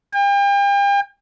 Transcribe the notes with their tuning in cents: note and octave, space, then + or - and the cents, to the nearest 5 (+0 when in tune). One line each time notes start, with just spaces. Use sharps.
G5 +40